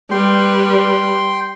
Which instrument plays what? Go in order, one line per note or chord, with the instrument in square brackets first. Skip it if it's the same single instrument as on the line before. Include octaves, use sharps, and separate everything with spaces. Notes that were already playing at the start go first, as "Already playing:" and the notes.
[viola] G3 B4 [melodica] G5 C6